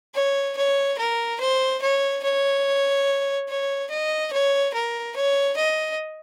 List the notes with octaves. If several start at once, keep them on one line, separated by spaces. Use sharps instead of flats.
C#5
C#5
A#4
C5
C#5
C#5
C#5
D#5
C#5
A#4
C#5
D#5